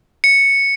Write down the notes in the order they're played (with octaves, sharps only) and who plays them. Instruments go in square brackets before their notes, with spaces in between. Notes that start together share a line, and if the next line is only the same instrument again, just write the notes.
[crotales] C#7